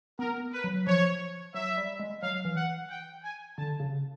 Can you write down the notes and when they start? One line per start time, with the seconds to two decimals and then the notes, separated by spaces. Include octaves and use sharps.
0.19 B3 A#4
0.53 B4
0.64 F#3
0.87 F3 C#5
1.54 F#3 E5
1.77 G3
1.99 G#3
2.22 F#3 F5
2.45 E3
2.56 F#5
2.90 G5
3.23 G#5
3.57 D3 A5
3.80 C#3